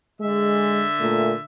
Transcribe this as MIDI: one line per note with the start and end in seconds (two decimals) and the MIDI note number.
0.21 1.43 50
0.21 0.85 56
0.21 1.43 76
1.00 1.33 46
1.00 1.33 57
1.00 1.33 58